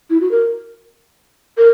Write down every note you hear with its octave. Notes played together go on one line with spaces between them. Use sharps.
E4
F#4
A#4
A#4